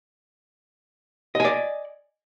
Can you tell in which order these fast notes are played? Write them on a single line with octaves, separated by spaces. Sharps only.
D#5 G#5 D5